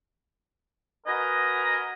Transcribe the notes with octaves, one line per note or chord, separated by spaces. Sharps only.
F#4 A#4 B4 D#5 G#5 A#5